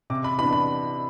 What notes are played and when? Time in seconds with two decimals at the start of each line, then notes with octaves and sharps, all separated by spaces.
0.10 C3 D6
0.24 B5
0.38 E3 B3 D4 B5
0.53 B5